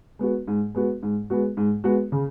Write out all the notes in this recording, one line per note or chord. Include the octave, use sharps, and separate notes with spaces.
G#3 B3 F#4
G#2
G#3 B3 F#4
G#2
G#3 B3 F#4
G#2
G#3 B3 F#4
C#3